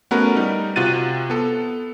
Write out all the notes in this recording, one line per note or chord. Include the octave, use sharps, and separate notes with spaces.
A3 B3 C#4 F#4 A#4 B4
G3 D#4 A#4
C3 F4 F#4 F#6 A6 D#7
B3 A4